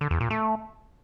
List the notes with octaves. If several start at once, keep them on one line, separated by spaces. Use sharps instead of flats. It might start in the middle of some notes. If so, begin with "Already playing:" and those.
D3
E2
A#2
A3